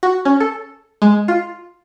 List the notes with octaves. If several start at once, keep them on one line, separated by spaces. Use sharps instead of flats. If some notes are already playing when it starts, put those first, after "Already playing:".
F#4
C#4
A4
G#3
F4